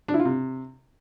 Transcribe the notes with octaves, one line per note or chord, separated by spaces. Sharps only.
D4
E4
F4
C3